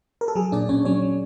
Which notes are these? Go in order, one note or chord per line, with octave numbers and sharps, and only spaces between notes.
A#4
A4
F#3 G#4
A#2 D4 D5
A#2 C#4 C#5
F#3 C#4 C#5
F#3